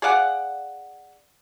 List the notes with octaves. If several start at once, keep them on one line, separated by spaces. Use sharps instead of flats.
G#4 D5 F5 F#5